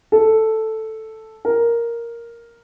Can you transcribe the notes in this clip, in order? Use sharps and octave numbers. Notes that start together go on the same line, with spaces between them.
A4
A#4